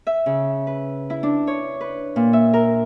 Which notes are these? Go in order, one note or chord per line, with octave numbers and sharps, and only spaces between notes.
E5
C#3
B4
E4
D4
C#5
B4
A#2
E5
A#4